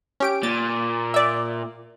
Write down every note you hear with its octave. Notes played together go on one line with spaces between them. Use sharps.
C#4 G4 D7
A#2 A6
D5 E5